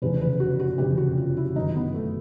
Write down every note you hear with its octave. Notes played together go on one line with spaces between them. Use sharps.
F1 E2 C#3 E3 B4
B4
F#4
F#4
F1 E2 C#3 E3 G4
F#4
F4
E4
G1 F#2 D#3 D#4
B3
A3